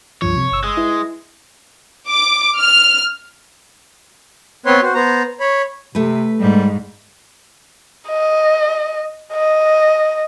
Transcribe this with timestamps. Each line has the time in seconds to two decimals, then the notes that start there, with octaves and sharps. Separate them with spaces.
0.22 C#2 G2 F3 C#5
0.37 C3
0.52 G1 E6
0.64 G#3
0.77 E4 B4
2.09 D6
2.59 F6
4.66 B3 C4 B4 C#5 C6
4.82 F#4 C5
4.95 B3 C5 A#5
5.40 C#5 B5
5.95 C3 A3 B4
6.40 G#2 G3
8.08 D#5
9.33 D#5